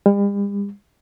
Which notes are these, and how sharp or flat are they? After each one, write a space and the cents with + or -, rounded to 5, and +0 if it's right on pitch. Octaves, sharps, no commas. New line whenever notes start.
G3 +45